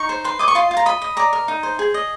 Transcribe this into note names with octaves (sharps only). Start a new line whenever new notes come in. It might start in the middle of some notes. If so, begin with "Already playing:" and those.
Already playing: D#4 C#6
C5
B4 C6
D#5 D6
C#6
F4 C6
F4
A#5
D#5 B5
D#5
D5 A#5
A#4
D#4
C5
G#4
D#5